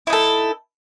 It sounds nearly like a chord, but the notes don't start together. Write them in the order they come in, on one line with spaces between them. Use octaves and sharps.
E4 D#4 A4